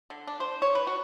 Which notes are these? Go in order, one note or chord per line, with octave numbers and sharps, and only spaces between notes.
D3
D4
C5
C#5
B4
F#4